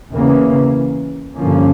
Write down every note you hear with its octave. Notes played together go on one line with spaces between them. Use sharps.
E2 C#3 E3 A#3 C#4
G2 D3 F3 A#3 C#4